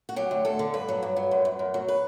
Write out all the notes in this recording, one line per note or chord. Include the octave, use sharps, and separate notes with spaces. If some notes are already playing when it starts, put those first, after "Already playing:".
F#4
F#3 G4
D2
D2 A4
D3
G2 B4
F#3
G2
F#3
F#2
F#2
F#2
F#3
B4